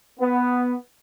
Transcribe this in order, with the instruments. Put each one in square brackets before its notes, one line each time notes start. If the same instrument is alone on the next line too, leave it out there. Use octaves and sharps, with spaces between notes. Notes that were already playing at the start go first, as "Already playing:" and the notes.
[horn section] B3